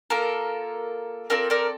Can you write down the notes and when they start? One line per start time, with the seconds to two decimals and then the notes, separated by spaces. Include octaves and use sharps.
0.10 A#3 F4 A4 A#4
1.30 C4 F4 A4 A#4 D5
1.50 A#4 D5